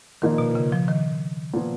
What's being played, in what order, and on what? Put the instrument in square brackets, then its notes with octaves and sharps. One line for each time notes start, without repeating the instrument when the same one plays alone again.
[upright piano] A#2 F3 A#3 D#4 [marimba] D#3
[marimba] B2
C#3
F3
D#3
[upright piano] A#2 F3 B3